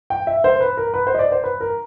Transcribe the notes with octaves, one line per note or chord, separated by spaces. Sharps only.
G5
E5
C5
B4
A#4
B4
C5
D#5
D5
C5
B4
A#4